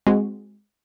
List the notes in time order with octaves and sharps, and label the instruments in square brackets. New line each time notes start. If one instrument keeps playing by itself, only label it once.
[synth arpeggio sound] G#3 C4 F#4